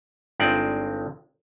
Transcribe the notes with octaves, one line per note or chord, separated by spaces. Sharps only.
G1 G2 G#3 C4 D#4 D5